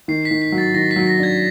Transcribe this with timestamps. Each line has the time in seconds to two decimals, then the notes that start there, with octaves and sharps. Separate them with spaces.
0.08 D#3 C7
0.25 B6
0.31 D#3
0.42 B6
0.52 F#3
0.58 A6
0.74 D#3 A#6
0.91 B6
0.96 F#3
1.07 A#6
1.18 D4
1.23 G#6